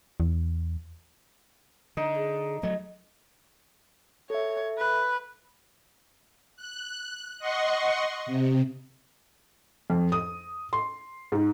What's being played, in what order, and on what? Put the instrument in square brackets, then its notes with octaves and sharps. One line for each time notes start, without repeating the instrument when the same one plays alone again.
[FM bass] E2
[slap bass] D3 [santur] D#4
[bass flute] G#4
[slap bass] F#3 A3 [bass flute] D#5
[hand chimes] A4 E5 [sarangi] C#5
[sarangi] B4
[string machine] F#6
D#5 F#5 C6 C#6
C3
[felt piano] F2
D#6
C6
G#2